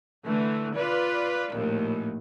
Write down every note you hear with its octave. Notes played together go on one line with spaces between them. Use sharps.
D3 E3 A3
F4 B4 D5
A#1 D#2 A2